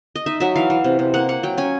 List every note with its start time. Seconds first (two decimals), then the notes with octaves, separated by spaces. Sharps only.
0.16 D#5
0.26 D#4 E5
0.40 F#3 E5
0.56 E3 F5
0.70 E3
0.84 C3
0.99 C3
1.14 A#3 F#5
1.28 A#3 F#5
1.43 F#3 G5
1.58 C#4 G#5